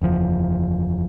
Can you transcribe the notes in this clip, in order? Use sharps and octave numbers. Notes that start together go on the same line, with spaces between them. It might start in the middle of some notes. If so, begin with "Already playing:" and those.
F#1 E2 F3